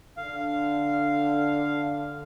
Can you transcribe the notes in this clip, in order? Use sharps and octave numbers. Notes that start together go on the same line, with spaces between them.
D3 F5